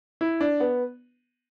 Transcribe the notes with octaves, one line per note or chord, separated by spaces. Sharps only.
E4
D4
B3